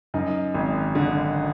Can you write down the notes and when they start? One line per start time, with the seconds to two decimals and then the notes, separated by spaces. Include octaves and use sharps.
0.14 F#2 D#4
0.55 G#1
0.95 D3